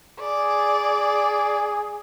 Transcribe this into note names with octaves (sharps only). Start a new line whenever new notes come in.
G#4 D5